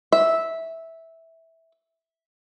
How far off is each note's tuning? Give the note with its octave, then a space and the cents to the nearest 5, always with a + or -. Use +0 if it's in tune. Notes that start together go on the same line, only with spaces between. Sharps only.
E5 -10